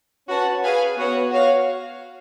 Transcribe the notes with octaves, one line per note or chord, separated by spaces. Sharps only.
C#4 F#4 B4 F#5 A5
G#4 B4 F5 G#5
B3 F#4 C#5 F#5
F#4 C#5 F5